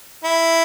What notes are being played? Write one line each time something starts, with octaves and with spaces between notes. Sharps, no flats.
E4